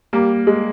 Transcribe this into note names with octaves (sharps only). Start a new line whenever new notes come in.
G3 A#3
G#3